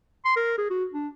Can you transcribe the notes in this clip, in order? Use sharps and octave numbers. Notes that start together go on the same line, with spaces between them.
C6
A#4
G#4
F#4
D4